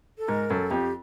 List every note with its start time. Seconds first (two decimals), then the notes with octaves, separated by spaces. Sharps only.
0.18 A4
0.28 G#2 A#4
0.50 F#2 A4
0.70 F2 G4